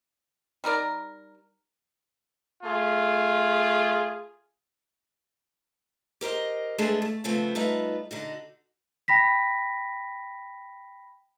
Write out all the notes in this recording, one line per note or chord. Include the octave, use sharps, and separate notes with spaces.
G3 D#4 A#4 D5
A3 F4 G#4
G4 A#4 C5 D#5
G#3 A3 B3 D4 G#4 A4
A3
C#3 F3 A3 B3 C4
G3 A3 D#4 F4 B4 E5
D3 D#4 F#4
G5 B5 A#6 B6